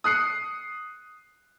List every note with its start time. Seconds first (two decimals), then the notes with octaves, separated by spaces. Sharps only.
0.04 D#6 F#6 C7 C#7